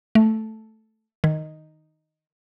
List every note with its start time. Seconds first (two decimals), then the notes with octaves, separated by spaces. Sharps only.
0.15 A3
1.24 D#3